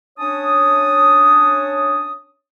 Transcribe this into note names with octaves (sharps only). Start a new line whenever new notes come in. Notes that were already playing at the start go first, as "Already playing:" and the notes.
C#4 D4 C#5 A5 D#6